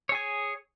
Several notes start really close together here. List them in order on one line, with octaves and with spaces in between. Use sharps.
C#5 G#4 G#5